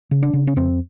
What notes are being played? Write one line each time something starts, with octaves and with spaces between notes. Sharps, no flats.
C#3
D4
C#3
C#4
F2 C4